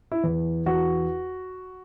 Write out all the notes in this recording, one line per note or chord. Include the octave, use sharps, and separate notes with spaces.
E4
E2
E2 F#4